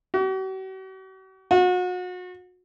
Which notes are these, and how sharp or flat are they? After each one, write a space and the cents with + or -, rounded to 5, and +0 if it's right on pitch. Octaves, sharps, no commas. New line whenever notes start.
F#4 +45
F#4 -35